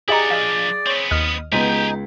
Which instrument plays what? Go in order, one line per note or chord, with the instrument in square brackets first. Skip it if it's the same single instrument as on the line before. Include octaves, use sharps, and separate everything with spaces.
[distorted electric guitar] E4 F#5 [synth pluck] G4 D#5 A#5 [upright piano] G#4 [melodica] D5
[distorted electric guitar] F3 D4 [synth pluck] D#5 F5
[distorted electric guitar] B3 C4 [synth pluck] C#5
[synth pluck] D#2 D#5 F6 [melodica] D#6
[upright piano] C#2 B6 [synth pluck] G#3 B3 [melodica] D#4 [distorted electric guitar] G4 G#5